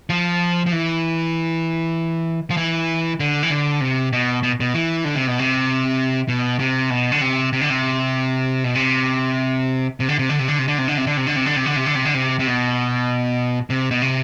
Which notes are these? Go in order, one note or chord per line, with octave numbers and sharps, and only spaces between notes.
F3
F3
E3
F3
E3
D3
E3
D3
C3
B2
B2
B2
E3
D3
C3
B2
C3
B2
C3
B2
D3
C3
C3
D3
C3
B2
C3
C3
D3
C3
D3
C3
D3
C3
D3
C3
D3
C3
D3
C3
D3
C3
D3
C3
D3
C3
D3
C3
D3
C3
C3
B2
C3
B2
C3